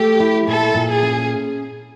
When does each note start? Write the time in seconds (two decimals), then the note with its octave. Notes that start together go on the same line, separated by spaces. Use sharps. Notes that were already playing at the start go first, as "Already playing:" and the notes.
Already playing: A3 G4
0.20 E4
0.47 A#2 A4
0.75 A#2
0.88 G#4
1.02 C#4